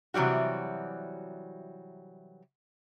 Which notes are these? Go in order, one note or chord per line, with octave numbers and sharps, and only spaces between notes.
C3 E3 F#3 G3 F#4